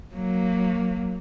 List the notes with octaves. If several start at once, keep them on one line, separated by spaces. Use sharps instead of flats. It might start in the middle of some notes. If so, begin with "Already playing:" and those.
F#3 A#3